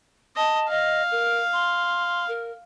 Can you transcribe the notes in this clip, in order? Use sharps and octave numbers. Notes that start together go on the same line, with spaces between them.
D#5 A5
D#5 F5
A#4
C6
A#4